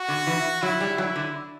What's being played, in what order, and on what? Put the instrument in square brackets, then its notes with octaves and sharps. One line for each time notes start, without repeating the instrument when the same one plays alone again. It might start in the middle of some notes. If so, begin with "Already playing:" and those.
Already playing: [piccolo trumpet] F#4
[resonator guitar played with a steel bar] D3
E3
[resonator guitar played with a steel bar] F#3 [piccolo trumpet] E4
[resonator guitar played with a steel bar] G3
[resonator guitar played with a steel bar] F#3 [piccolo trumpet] E4
[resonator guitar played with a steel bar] D3